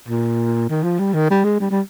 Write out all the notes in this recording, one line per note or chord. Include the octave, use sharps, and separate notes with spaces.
A#2
D#3
F3
G3
D#3
G3
G#3
G3
G3